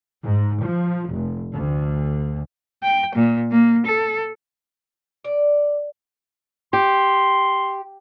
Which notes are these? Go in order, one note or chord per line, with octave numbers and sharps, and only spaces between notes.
G#2
F3
F1
D2
G5
A#2
A#3
A4
D5
G4 C6